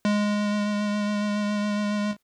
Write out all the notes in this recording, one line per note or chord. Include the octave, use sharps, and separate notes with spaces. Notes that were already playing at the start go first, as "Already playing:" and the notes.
G#3